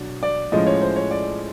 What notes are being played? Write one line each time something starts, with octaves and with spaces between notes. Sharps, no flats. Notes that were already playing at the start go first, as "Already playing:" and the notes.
Already playing: B2 F#3 D4
D5
A2 F3 G#3 C#4 D#5
C#5
C5
C#5
D5